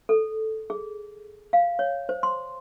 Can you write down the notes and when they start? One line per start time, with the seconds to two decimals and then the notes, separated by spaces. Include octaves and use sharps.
0.09 A4
0.70 G#4
1.53 F5
1.79 C#5
2.09 C5
2.23 C6